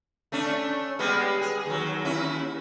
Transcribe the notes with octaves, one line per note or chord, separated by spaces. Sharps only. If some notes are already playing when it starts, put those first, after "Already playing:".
A3 C#4 D4
G3 G#3 B3
G#4
D#2 F#3
D#2 C#4 E4